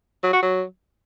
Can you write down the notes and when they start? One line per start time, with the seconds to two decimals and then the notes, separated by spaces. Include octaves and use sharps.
0.24 F#3
0.33 F#4
0.43 F#3